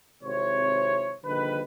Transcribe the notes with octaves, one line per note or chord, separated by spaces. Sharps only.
G#1 C3 E4 C5 C#5
A#1 D3 D#3 G3 B4